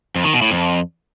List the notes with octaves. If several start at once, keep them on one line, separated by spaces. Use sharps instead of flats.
F2
D#3
B2
A2
F2